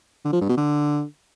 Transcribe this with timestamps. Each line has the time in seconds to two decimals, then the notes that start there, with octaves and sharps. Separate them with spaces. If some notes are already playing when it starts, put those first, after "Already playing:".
0.25 D3
0.33 F3
0.41 G2
0.49 B2
0.57 D3